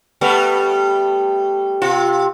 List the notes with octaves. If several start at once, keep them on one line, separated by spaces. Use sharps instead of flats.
G3 A3 B3
C3 F4